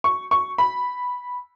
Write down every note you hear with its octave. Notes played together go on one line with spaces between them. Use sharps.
C#6
C#6
B5